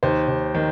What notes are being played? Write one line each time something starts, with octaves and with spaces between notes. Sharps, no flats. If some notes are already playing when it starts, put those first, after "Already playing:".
D#2 C5
D#2
D#3